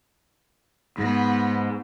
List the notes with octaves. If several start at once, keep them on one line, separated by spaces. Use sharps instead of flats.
G#2 B3